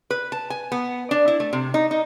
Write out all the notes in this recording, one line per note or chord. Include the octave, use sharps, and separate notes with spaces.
B4
A5
G#5
B3
D4
E4
A3
C3
D#4
D#4